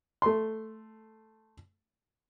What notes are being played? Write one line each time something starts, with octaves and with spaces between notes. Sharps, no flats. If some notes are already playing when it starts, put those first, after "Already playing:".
A3 C6